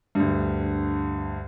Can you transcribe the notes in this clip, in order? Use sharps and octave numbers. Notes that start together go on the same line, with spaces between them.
D2 G2